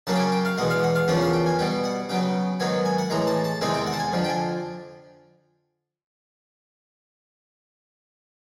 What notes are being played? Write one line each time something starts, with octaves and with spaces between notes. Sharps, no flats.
C#3 F#3 A#3 C#4 A5
G5
G#5
G5
F5
E2 B2 G#3 F#5
F5
F#5
F5
E2 C#3 F3 A#3 C#4 F#5
F5
G5
G#5
B2 G3 B3 G5
F#5
C#3 F#3 B3 G5
G#2 D#3 F#3 B3 G#5
G#5
F#5
A2 E3 G#3 A#5
A5
A5
E2 C3 D#3 G#3 C4 G#5
G5
F#5
A5
G#5
F2 D3 F3
G5
G#5